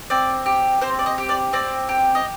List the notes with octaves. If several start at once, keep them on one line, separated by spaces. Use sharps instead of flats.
C4 D5
G4
C4 C5
D5
D#5
G4
D5
C4 D5
G4
D#5